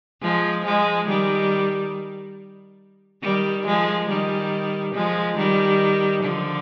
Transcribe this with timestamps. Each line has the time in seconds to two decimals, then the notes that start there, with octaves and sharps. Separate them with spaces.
0.22 F3 G#3
0.65 F3 G#3
1.08 D#3 G3
3.22 D#3 G3
3.66 F3 G#3
4.08 D#3 G3
4.94 F3 G#3
5.37 D#3 G3
6.23 D3 F3